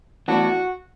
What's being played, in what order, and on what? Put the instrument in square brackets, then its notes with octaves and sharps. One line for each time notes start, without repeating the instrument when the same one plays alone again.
[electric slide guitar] A2 E3 B3 D4 [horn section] F#4